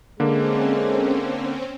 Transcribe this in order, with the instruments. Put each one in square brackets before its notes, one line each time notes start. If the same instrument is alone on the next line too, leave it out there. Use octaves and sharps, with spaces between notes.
[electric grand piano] D3 A#3 [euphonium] G#3 [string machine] C4 C#4